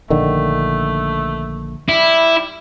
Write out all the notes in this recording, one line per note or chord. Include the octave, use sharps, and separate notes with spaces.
A#1 D3 D#3 A3
G3 E4